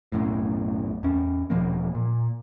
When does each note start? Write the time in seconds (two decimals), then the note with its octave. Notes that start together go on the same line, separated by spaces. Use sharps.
0.12 B1 F#2 A2
1.03 E2 C#4
1.50 E1 B2 F3 A#3
1.95 A#2